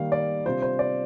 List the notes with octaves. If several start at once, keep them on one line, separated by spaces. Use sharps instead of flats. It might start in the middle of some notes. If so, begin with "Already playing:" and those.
Already playing: D#3 G3 A#3 F5
D5
C3 G3 D4 F4 C5
C5
D5